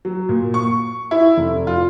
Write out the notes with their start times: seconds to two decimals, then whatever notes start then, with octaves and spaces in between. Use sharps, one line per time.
0.05 F#3
0.29 A#2
0.54 C#6
1.11 E4
1.37 F1
1.67 F4